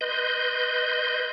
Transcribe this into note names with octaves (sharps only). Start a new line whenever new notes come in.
B4 D#5 C6 G6